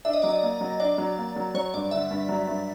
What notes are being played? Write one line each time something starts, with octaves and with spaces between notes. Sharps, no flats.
D4 E5
D#5
F#3 D5
D#5
A#3
F#3
D4 D5
F#3
A#3
F#3
F#3 C#5
G2 D5
D3 E5
G2
F#3
G2